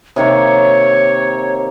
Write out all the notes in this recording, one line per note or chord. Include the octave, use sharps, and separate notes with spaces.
C3 D#3 A#3 C#5